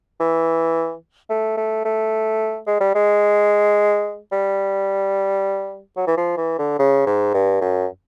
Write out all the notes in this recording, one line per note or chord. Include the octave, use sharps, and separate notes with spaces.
E3
A3
A3
A3
G#3
G3
G#3
G3
F#3
E3
F3
E3
D3
C#3
G#2
G2
F#2